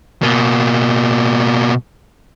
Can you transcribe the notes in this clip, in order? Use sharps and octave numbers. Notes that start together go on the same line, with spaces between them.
B2 A#3